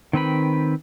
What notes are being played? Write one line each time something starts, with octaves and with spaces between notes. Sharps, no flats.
D#3 C4 B4 B5